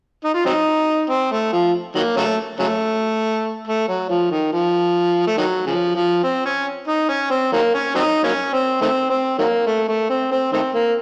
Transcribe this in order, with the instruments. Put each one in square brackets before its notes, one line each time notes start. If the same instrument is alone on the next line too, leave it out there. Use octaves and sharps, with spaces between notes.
[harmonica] D#4
F4
F#3 C4 D#4
C4
A3
F3
D#3 F#3 A#3
C#3 F#3 A3
C#3 F#3 A3
A3
F#3
F3
D#3
F3
A3
D#3 F#3
C#3 F3
F3
C4
C#4
D#4
C#4
C4
D#3 F#3 A#3
C#4
F#3 C4 D#4
F#3 A#3 C#4
C4
D#3 A3 C4
C4
D#3 F#3 A#3
A3
A3
C4
C4
D#3 A3 C4
A#3